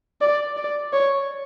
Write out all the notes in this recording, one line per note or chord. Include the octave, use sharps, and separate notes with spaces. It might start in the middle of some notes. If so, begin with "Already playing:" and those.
D5
D5
C#5